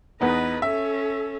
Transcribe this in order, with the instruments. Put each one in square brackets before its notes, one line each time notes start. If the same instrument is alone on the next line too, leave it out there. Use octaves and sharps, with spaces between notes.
[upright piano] E2 B3 D#4 [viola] B4 D#5
[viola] C#4 A4 [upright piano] E5